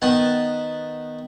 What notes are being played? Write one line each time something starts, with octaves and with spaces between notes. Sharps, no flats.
D#3 B3 A5